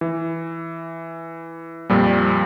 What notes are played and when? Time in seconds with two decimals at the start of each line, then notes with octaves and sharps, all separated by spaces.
0.01 E3
1.90 F2 A#2 F3 G3